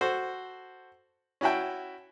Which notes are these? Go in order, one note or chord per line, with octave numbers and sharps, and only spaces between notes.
F#4 A4 C5
C#4 E4 F#4 E5 G5